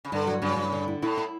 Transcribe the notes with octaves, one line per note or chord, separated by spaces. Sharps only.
C#3
G2 D3
F#3
G2 C#3
G2
D3
E4
A2 E4
E4